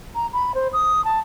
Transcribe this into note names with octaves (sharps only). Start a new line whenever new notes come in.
A#5
B5
C5
D#6
A5